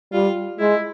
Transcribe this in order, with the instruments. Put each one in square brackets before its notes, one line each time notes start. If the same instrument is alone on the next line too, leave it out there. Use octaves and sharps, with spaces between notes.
[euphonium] G3 [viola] F4
[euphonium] G#3 [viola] E4